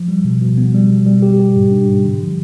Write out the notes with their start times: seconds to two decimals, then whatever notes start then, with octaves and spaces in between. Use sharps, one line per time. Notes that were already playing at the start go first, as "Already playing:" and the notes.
Already playing: F3
0.08 G3
0.24 B2
0.42 B2
0.58 B3
0.74 G3
0.90 B2
1.06 G3
1.22 G4
1.39 G4
1.56 G#2
1.71 D4
1.88 G#2
2.05 D3
2.21 F3